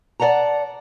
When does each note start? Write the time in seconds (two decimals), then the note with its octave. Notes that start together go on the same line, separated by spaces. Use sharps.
0.20 D5 D#5 F#5 A5 A#5